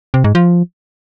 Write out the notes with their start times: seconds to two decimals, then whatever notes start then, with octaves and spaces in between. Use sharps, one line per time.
0.14 C3
0.24 G#2
0.35 F3